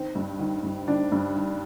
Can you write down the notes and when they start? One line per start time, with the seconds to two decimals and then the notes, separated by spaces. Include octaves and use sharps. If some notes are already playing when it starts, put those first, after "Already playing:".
Already playing: D#3 C4
0.15 G2
0.40 D#3
0.63 G2
0.88 D#3 D4
1.12 G2
1.36 D#3